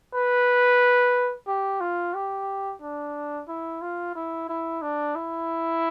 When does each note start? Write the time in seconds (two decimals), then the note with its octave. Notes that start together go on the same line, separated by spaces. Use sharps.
0.14 B4
1.48 G4
1.81 F4
2.14 G4
2.82 D4
3.48 E4
3.82 F4
4.15 E4
4.49 E4
4.82 D4
5.15 E4